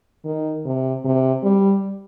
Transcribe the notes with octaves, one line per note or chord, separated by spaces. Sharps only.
D#3
C3
C3
G3